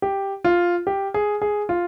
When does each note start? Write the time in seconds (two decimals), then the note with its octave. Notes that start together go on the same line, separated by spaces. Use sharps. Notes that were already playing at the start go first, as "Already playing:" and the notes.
0.02 G4
0.45 F4
0.87 G4
1.14 G#4
1.42 G#4
1.69 F4